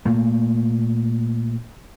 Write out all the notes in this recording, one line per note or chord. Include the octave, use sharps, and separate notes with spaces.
A#2 A3 A#3